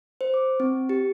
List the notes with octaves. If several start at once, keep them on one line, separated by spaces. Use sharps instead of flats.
C5
D6
C4
G4